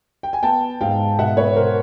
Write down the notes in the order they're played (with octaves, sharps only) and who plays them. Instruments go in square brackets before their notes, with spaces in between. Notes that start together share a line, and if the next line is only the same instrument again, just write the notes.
[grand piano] G5
G#5
B3 G5 A5
G#2 F5 G5
B2 E5 F#5
B4 C#5
B2 A#4 C5